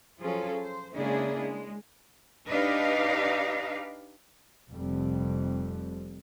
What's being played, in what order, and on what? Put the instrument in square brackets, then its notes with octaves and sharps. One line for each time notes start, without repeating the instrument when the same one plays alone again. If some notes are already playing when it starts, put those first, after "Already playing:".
[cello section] F3 F#3 C#4 F4 G#4 A4
C5
C#3 G#3 A#3 D4 E4 G#4
G#3
D4 D#4 G4 B4 D#5 F5
[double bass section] F1 F2 C3 G3